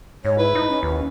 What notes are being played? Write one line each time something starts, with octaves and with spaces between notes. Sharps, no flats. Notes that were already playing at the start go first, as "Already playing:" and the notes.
G#2 C#5
E4 B4
D#4
C#4
D#2